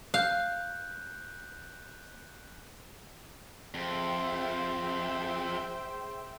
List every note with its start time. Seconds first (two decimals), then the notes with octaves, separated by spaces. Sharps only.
0.14 F5 F#6 G6
3.74 F2 G#4 C5 E5 G5